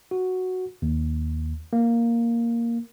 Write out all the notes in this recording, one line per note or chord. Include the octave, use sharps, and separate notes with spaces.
F#4
D#2
A#3